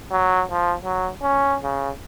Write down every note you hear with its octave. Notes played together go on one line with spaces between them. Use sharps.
F#3
F3
F#3
C#4
C#3